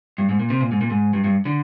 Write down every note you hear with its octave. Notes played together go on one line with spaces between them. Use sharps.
G2
G#2
A#2
C3
A#2
G#2
A#2
G#2
G2
G2
D3